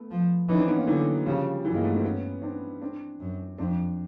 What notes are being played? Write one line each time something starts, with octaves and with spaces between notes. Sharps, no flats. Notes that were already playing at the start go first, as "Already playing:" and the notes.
Already playing: A3 B3
F3
E3 C#4 D#4
C4 D4
B3 C#4
A#3 C4
D3 E3 F#3
C#3 F3 G3
G2 E3 F#3
G#3 A#3
A3 B3
A#3 C4
B3 C#4
C4 D4
C4 D4
F#2
F2 C4 D4